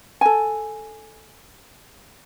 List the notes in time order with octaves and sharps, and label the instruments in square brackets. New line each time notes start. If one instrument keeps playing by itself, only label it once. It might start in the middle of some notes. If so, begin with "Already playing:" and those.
[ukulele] A4 G#5